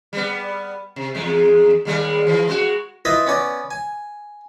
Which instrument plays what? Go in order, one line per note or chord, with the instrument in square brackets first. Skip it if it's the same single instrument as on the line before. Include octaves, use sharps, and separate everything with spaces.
[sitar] G3 B3
C3
E2 G#3
D#2 G3 G#3
E3 F3
G#3 C4 F#4
[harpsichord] E4 F4 B4 C5 D#5 E5
B3 C#4 D5
G#5